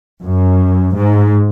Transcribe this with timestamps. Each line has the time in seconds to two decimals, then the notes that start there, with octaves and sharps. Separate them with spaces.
0.24 F#2
0.95 G#2